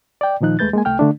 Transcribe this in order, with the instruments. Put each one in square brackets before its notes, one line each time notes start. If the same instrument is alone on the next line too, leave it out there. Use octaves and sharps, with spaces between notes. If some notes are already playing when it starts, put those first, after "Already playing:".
[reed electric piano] D5 G5
A#2 D#3 F3 D#4 F#6
D#2 G#3 A3 B4 G6 A6
G#3 A#3 G#5
C2 A3 G5 F6
D3 A3 D4